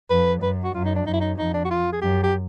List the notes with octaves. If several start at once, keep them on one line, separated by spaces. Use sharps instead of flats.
F2 B4
F#2 B4
F#4
F#2 F4
D#4
D4
F#2 D#4
E4
D#4
F2 D#4
D4
F#4
F4
G#4
F#2 G4
G4